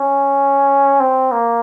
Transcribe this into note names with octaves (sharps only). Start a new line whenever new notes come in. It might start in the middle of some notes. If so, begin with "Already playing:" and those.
Already playing: C#4
C4
A#3